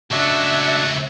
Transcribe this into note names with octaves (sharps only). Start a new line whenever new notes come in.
C#2 A3 D4 F#4 E5 G#6